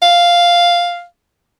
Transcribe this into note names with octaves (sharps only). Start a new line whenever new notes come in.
F5